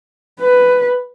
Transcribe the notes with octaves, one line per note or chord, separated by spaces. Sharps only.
B4